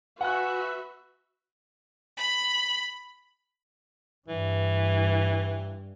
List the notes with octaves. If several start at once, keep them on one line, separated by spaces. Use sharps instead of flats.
F#4 B4 E5 F#5 G#5 F#6
B5
G2 E3